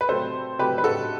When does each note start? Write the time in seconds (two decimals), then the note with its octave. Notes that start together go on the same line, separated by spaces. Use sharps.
0.01 B4
0.09 C3 F#3 A3 C4 A4 C5
0.59 C3 F#3 A3 C4 G4 B4
0.78 B4
0.84 F#4 A4